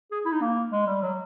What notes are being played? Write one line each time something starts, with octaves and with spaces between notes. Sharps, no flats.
G#4
E4
D#4
A#3
G#3
G3
F#3